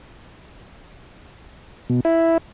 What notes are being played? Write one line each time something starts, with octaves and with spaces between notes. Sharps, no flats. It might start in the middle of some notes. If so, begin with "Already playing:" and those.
B2
E4